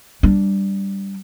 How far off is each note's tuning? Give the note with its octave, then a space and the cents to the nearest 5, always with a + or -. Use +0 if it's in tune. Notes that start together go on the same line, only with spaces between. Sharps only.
G3 +0 D4 +0